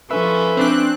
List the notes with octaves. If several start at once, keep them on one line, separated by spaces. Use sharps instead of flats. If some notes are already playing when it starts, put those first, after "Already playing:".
F3 C#4 A4 B4 E5
C4 D4 F#6